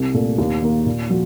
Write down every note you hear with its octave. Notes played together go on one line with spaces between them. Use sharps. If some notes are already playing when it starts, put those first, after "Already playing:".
Already playing: C2
A#2 A3
D#2
D#3 A#3
A#2
F3 F#4